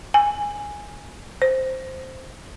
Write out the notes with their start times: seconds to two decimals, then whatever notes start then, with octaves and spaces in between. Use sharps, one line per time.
0.14 G#5
1.42 C5